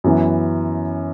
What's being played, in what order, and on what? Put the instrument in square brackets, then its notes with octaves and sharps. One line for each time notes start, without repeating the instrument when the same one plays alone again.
[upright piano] F#2 E3 B3